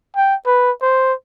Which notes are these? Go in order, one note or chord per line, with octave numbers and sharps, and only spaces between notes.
G5
B4
C5